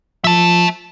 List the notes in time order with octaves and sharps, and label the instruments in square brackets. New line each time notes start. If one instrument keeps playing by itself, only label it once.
[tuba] F3 [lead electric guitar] E5 A5